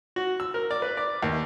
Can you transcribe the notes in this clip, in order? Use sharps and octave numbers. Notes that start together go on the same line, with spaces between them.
F#4
E6
A#4
D5
B4
D5
D#2